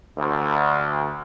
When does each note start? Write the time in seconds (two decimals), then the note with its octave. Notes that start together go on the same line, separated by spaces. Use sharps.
0.18 D2